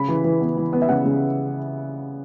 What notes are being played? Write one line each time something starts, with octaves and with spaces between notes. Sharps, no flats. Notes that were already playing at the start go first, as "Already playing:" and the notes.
Already playing: C#3 B5
E3
E3
B3
E3
B3
E5
C#3 F#5
C#3